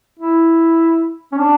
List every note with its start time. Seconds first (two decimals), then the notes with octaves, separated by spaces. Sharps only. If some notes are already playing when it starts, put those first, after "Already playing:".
0.19 E4
1.32 C#4
1.38 D4